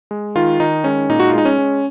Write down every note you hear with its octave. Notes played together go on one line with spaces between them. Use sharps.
G#3
D#3 F4
D#3 D#4
G#3 C#4
A#2 D#4
F#4
F4
G#3 D#4
C#4
G#3